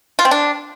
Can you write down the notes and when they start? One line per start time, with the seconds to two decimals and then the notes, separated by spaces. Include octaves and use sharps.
0.19 F4
0.25 C4
0.31 D4